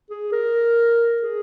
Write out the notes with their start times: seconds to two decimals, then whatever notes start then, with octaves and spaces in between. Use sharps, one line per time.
0.10 G#4
0.32 A#4
1.22 G#4